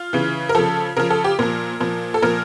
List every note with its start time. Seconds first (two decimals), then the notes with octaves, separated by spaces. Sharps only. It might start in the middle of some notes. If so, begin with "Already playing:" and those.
Already playing: F4
0.13 C#3 E3
0.49 A#4
0.55 C#3 F3 A4
0.97 C#3 F3 A#4
1.10 A4
1.24 G4
1.39 A#2 F3 A#4
1.80 A#2 F3
2.14 A4
2.22 A#2 F3 A#4